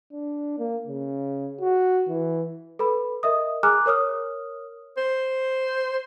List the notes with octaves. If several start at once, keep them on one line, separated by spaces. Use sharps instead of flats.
D4
A#3
C#3
F#4
E3
A4 B4 B5
A#4 D#5 E5 D#6
G#4 G#5 A#5 D6 F6 F#6
A#4 C#5 D#6 F6
C5